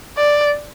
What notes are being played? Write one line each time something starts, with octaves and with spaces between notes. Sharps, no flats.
D5